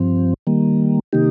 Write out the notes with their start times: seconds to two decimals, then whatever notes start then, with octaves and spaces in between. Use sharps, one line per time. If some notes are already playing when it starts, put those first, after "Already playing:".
Already playing: G2 F3 C4
0.47 D#3 G3 A#3
1.13 C3 D#3 A#3 D#4 G4